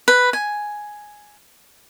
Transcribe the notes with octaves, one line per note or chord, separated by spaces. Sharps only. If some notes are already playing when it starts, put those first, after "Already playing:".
B4
G#5